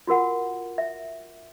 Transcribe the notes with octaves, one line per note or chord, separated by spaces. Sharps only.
F4 F#4 A#4 F#5
E5